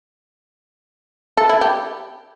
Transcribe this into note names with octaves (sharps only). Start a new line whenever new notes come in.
A4
E4
G4